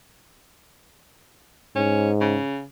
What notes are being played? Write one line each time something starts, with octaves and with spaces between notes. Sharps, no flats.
G#2 C#4
C#3